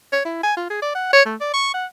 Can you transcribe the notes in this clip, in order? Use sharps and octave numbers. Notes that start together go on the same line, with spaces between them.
C#5
E4
G#5
F4
G#4
D5
F#5
C#5
A3
D5
C#6
F#5